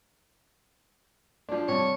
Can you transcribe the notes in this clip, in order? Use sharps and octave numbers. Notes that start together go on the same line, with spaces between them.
F3 D4
G2 C3 C#5